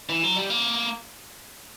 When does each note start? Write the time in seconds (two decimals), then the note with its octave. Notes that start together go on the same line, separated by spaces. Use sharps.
0.09 E3
0.23 F#3
0.37 G3
0.50 A#3